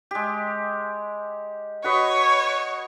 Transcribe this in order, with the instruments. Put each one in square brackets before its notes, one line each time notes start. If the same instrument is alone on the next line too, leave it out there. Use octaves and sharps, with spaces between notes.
[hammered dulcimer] G#3 G4
[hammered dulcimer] F#4 B4 D#5 [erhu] C#5